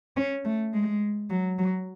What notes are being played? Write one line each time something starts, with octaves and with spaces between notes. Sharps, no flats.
C#4
A3
G#3
F#3
F#3